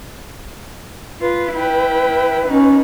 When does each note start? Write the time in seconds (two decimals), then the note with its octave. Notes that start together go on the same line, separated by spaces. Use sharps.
1.21 F4 B4
1.54 E4 G5
2.46 B2 C#4 D#4